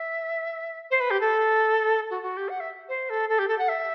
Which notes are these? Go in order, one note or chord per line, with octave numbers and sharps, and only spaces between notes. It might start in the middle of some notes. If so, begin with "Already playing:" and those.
Already playing: E5
C5
B4
G4
A4
F#4
F#4
G4
F#5
E5
C5
A4
A4
G4
A4
F#5
E5